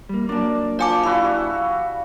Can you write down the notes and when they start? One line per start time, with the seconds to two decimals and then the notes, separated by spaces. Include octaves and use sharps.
0.09 G3 A#3
0.29 F#3 A#3 D4 D5 A5
0.79 F3 D5 G#5 D6
1.04 G3 E4 F#4 F5